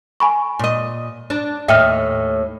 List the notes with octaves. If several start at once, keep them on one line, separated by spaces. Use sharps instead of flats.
G#5 B5 C#6
A#2 D#5
D4
D#2 A2 D#5 E5 G5 F6